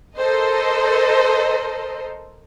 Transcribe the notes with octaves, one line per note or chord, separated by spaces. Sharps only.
A4 A#4 C5 D#5